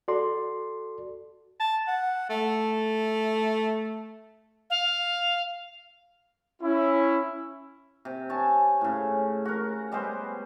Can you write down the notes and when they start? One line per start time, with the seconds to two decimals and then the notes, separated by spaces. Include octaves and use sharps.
0.08 F#4 A4 D5 C6
1.60 A5
1.87 F#5
2.29 A3
4.70 F5
6.62 C#4 E4
8.05 C3
8.29 C#5 G#5 A5
8.81 A2 C#3
9.45 F#4 A#4
9.92 G3 G#3 B3 C5